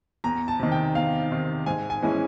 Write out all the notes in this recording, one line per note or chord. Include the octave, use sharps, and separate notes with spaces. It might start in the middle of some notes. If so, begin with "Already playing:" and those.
E2 A#5
A5
C3 D#3
G5
E2 F5
C3 D#3
G#2 G#5
G#5
E3 G#3 C#4 E4